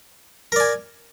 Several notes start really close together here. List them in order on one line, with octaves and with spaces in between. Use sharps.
A#4 D5 G#5